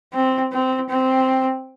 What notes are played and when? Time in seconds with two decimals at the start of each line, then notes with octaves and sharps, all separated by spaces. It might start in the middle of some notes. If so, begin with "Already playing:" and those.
0.13 C4
0.52 C4
0.90 C4